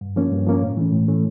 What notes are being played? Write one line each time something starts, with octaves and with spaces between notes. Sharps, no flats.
G2
F3 A#3 C#4
G2
F3 A#3 C#4
A2
E3 A3 C#4
A2
E3 A3 C#4